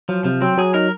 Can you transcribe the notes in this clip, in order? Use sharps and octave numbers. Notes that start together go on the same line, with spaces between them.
F3 F#3
C3 F3
F#3 C4
F#3 G#4
D#4 A#4